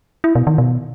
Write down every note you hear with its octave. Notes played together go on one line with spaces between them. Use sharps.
E4
B2
D#3
B2